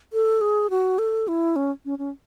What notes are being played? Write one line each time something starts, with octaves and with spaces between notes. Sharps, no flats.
A4
G#4
F#4
A4
E4
C#4
C#4
C#4